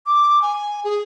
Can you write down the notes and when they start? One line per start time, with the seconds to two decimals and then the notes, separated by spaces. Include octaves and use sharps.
0.07 D6
0.42 G#5
0.84 G#4